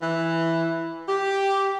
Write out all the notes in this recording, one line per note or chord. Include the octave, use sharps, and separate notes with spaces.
E3
G4